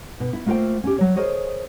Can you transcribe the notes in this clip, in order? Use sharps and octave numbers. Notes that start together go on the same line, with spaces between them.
B2
E4
A3 A#3 F4 B4 C5 G5
C#4 G4
F#3 C#5
G#4 A#4 C5 C#5 D#5